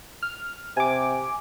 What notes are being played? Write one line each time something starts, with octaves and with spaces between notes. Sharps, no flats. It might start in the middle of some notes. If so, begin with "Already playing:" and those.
F6
C3 G#5 D6